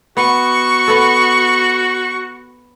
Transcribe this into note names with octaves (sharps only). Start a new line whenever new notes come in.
B3 F#4 C#6
B3 A4